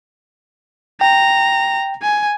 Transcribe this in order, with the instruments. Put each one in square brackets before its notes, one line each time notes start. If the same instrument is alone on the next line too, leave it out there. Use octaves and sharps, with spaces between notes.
[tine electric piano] G5 [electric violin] A#5
[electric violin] G#5